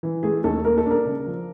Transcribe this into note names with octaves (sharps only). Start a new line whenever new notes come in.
E3
A3 G#4
D#2 A4
A#3 A#4
A4
D4 A#4
C#3
F3